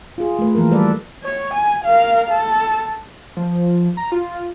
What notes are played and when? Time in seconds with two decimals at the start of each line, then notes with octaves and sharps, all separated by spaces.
0.18 F4 G#4
0.39 A3 B4
0.55 E3 F3 A#3 A#4
0.71 G3 A4 B4 D5
1.24 C#5
1.54 G#5
1.84 A#4 F5
2.30 A4
3.37 F3
3.97 A#5
4.12 F4